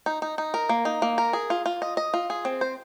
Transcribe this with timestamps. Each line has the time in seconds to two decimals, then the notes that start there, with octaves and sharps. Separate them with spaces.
0.06 D#4
0.22 D#4
0.38 D#4
0.54 A#4
0.69 A#3
0.85 D#4
1.02 A#3
1.18 A#4
1.33 G#4
1.50 F4
1.66 F4
1.82 D#5
1.97 D#5
2.14 F4
2.30 G#4
2.45 C4
2.61 C5